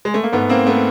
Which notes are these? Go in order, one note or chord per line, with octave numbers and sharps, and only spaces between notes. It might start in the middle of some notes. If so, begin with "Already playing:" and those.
G#3
A3
A#3
G#2 A3 B3
A#3 C4
A3 B3